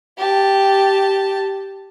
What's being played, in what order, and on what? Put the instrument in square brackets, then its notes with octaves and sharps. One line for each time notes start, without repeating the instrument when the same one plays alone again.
[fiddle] G4 A5